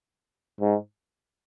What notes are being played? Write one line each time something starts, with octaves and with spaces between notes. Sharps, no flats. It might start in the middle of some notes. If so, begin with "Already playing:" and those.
G#2